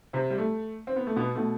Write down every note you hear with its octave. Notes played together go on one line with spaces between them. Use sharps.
C3 C4
G3
A3
C4
B3
A3
B2 B3
B2 A3